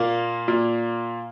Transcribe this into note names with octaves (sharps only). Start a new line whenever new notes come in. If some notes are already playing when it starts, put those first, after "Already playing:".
Already playing: A#2 A#3
A#2